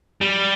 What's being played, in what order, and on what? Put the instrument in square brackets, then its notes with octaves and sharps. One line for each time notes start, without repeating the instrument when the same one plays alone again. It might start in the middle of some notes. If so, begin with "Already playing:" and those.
[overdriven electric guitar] G3